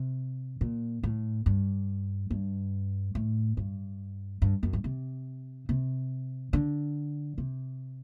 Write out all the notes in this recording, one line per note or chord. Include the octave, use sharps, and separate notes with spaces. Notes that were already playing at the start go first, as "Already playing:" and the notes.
Already playing: C3
A#2
A2
G2
G2
A2
G2
G2
F#2
G2
C3
C3
D3
C3